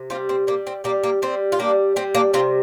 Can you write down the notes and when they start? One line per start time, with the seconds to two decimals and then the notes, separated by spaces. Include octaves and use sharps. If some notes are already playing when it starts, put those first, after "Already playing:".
Already playing: C3
0.10 G3 C4 F4
0.29 C4
0.47 G3 A#3
0.67 C4
0.84 G3 A#3 D4
1.04 A#3
1.22 G3 C4
1.52 F4
1.59 G3 A#3 D4
1.96 G3 C4
2.15 A#3 D4
2.33 C3 C4 F4